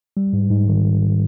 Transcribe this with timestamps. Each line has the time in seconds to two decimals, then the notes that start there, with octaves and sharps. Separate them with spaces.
0.17 G3
0.33 G#2
0.51 G#2
0.68 D#3